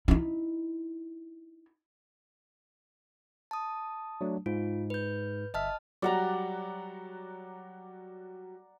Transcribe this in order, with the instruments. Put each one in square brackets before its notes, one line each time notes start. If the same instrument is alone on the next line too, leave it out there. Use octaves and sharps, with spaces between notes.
[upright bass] D#4 E4
[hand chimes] A5 D#6
[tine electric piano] F#3 A3 D4
[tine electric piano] G#2 [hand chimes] F4
[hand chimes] B4 G6
[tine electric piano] G1 E5 [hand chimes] D#5 A5 F6
[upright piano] F#3 G3 F#4 [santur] D5 F#5 A#5